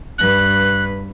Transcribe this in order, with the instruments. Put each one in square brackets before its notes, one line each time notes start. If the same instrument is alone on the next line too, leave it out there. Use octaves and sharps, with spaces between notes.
[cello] G2 B4 [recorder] F#6